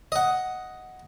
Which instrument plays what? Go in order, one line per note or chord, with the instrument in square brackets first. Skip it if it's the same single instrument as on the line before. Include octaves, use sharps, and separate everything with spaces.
[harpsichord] D#5 F#5